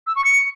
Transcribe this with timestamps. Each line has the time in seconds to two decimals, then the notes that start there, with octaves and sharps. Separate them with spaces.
0.07 E6
0.16 C#6
0.24 C#7